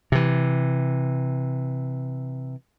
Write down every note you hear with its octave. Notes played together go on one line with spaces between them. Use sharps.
C3 E3